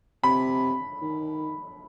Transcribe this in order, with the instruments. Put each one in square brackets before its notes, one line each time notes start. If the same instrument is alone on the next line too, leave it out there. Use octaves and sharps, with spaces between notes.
[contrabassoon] C3 [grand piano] B5
[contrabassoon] D#3